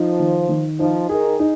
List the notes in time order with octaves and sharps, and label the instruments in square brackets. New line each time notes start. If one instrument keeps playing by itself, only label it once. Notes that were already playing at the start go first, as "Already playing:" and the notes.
Already playing: [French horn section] F3 [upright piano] D#4
[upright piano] D#3
D#3
[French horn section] F3 [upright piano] D#4
[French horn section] D#3 [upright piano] G#4
[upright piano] D#4